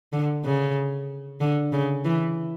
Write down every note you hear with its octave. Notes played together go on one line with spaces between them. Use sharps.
D3
C#3
D3
C#3
E3